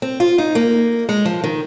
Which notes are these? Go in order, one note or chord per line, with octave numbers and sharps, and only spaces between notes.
C4
F4
D#4
A#3
G#3
F3
D#3